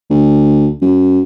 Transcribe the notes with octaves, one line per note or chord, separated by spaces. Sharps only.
D2
F#2